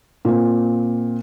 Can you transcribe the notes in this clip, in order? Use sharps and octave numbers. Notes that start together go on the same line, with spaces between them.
A#2 A#3 C4